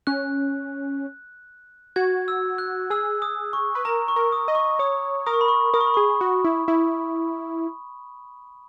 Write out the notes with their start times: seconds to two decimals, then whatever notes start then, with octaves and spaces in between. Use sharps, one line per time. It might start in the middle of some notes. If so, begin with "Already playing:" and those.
0.07 C#4 F#6
1.96 F#4 G#6
2.28 E6
2.58 F#6
2.90 G#4 E6
3.22 D#6
3.53 C#6
3.75 B4
3.85 A#4 A#5
4.08 C#6
4.16 A#4
4.32 D#6
4.48 D#5
4.55 C#6
4.79 C#5 D#6
5.26 A#4 D#6
5.33 C#6
5.41 B5
5.48 C#6
5.74 A#4 D#6
5.81 C#6
5.87 B5
5.94 G#4 C#6
6.21 F#4
6.45 E4
6.68 E4